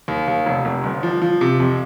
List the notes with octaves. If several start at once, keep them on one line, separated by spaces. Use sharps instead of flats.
D#2
D#2
F1
F1
G1
F3
F3
C3
F2